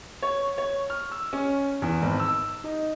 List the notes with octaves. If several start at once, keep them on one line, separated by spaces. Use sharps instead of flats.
C#5
C#5
F6
E6
C#4
E2
G#1
E6
D#4